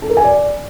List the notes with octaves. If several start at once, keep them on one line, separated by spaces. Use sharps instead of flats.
A4
A#4
G#5
D5